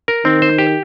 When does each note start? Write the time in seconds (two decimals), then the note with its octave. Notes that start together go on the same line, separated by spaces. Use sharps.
0.08 A#4
0.24 D#3 C4
0.42 C5
0.58 G4